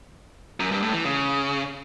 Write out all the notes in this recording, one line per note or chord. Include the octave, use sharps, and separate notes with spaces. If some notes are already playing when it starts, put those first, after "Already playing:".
F#2
G2
A2
E3
C#3